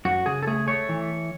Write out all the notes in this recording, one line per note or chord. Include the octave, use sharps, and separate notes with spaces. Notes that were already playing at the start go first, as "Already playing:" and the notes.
F#2 F#4
C#3 G#4
A4
A3 G#4
A3 C#5
E3